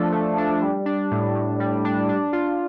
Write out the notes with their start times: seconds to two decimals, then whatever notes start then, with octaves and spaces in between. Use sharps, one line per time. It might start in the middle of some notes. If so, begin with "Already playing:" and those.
Already playing: F3 A3 D4 A4
0.12 A3
0.38 D4
0.62 G3
0.86 D4
1.11 A2
1.35 A2
1.60 G3
1.85 D4
2.09 D4
2.33 F4